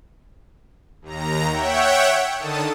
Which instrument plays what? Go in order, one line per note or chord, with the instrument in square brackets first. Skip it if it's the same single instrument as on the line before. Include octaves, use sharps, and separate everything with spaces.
[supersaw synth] D#2 A#5
C#5 E5 F#5 G5
D3 D#3 A4 A5 D#6